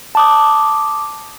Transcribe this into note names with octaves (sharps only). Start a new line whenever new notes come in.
A5 D6 D#6